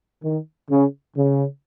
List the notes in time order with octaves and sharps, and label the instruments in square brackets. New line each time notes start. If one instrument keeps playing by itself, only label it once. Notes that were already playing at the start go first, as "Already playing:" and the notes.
[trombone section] D#3
C#3
C#3